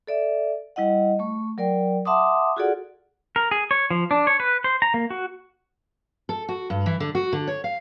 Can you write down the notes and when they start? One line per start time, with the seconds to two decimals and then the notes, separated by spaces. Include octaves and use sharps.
0.07 A4 D5 E5
0.76 G3 E4 D#5 F#5
1.19 A3 C#6
1.58 F#3 A#4 D5 G5
2.05 E5 F#5 A5 C6 D6 D#6
2.56 F4 F#4 G#4 A4 D5 F#5
3.36 A#4
3.51 G#4
3.71 C#5
3.90 F3
4.11 D4
4.27 C#5
4.40 B4
4.64 C5
4.82 A#5
4.94 A#3
5.10 F#4
6.29 A4
6.49 F#4
6.70 G2
6.86 E3
7.00 D3
7.15 F#4
7.33 D3
7.47 C#5
7.64 F5